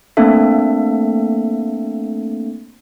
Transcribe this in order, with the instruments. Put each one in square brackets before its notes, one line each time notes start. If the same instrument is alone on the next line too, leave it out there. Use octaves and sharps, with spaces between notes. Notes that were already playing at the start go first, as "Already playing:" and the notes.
[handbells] A3 A#3 C4 D4 A4 E5